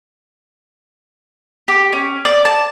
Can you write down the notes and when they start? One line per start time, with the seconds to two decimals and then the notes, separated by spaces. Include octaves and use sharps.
1.68 G4
1.93 C#4
2.25 D5
2.45 A5